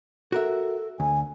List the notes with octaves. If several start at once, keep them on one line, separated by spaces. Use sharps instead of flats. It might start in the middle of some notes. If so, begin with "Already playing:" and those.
F#4 A4 A#4 E5
D2 G#5